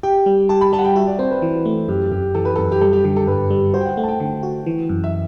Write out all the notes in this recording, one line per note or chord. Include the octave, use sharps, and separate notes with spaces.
G4 G5
G3
G4 A5
B5
G3 A5
F#5
G5
F#4 E5
D5
C4 C5
B4
E3 B4
A3
F#2 G4
F#2 G4
E3 A4
B4
F#2 A4
G4
G3 A4
G4
D3 G4
A4
G2 B4
G3
F#4 C5
G5
F#5
A3 F#5
A5
G5
D3 G5
F#4
E3
F#2
E5